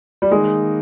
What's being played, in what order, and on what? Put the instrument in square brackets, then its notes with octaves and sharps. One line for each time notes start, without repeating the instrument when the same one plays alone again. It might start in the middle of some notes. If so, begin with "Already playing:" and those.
[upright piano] G3
[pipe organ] D#3 A#3 D#4 [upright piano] G#3